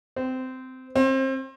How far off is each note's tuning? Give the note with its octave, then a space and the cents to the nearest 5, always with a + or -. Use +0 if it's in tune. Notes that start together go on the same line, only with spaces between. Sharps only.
C4 -20
C4 +30